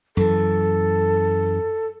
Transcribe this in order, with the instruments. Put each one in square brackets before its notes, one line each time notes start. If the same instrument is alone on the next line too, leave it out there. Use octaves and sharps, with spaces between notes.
[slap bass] F#2 E3 [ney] A4